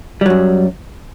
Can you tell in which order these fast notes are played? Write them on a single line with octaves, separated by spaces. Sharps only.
G3 F#3 F#2